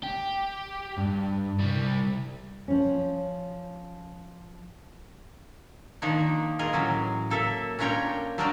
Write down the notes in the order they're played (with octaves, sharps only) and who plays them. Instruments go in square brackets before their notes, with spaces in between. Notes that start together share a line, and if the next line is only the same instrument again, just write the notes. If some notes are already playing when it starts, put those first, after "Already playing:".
[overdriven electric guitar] G4
G2
C2 G3
[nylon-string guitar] F3 C#4
[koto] D#3 F3 A#3 D4 D#4
F4 G#4 A#4 D#5
A2 E3 F#3 C#4
A#3 A4 A#4 E5
C#4 D4 F4 A#4 C#5 G5
F#3 G3 D4 F4 A#4 D5